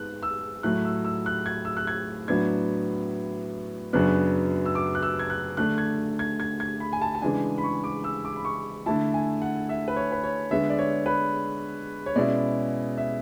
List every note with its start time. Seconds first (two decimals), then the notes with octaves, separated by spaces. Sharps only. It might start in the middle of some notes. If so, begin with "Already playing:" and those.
Already playing: G#2 G#3 B3 F#6
0.23 E6
0.63 A2 F#3 A3 F#6
0.85 E6
1.05 E6
1.26 F#6
1.46 G#6
1.65 E6
1.77 F#6
1.87 G#6
2.28 A2 F#3 B3 D4 G#6
3.93 F#2 C#3 F#3 B3 D4 F#6
4.65 E6
4.75 D6
4.95 F#6
5.03 E6
5.19 G#6
5.30 F#6
5.57 D3 A3 D4 F#6
5.78 G#6
6.19 G#6
6.40 G#6
6.60 G#6
6.80 B5
6.93 G#5
7.01 A5
7.15 A5
7.22 C#3 E3 G#3 D4 G#5
7.58 B5
7.64 C#6
7.84 D6
8.04 E6
8.25 D6
8.36 B5
8.45 C#6
8.86 D3 A3 E4 A5
9.14 G#5
9.42 F#5
9.69 E5
9.88 B4
9.96 C#5
10.12 B4
10.24 C#5
10.51 D3 G#3 B3 E5
10.70 D5
10.79 C#5
11.06 B4
12.06 C#5
12.16 B2 G#3 C#4 E4 D5
12.97 E5